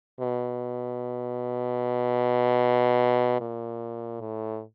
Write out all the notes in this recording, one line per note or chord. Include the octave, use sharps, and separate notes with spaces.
B2
A#2
A2